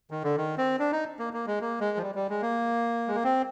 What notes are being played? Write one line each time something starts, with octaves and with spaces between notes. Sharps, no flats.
D#3
D3
D#3
C4
D4
D#4
A#3
A#3
G#3
A#3
G#3
F3
G3
G3
G#3
A#3
G#3
A#3
C4